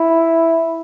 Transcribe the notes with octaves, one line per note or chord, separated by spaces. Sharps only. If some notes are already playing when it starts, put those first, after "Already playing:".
Already playing: E4